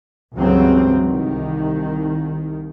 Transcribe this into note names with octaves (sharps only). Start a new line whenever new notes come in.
C#2 G2 C#3 E3 F#3 C4
C2 D#3